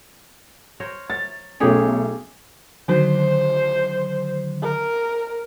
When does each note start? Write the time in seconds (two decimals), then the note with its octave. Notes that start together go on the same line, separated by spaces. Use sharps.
0.80 A#4 C5 C#5
1.10 C#5 A6
1.60 B1 A3 C#4 G4 G#4 C#5
2.88 D3 D#3 F#3 C5
4.63 A#4